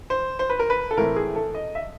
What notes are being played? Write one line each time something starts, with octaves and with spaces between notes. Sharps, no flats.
C5
C5
B4
A#4
B4
A4
A2 E3 A3 C4 A#4
G#4
A4
D#5
E5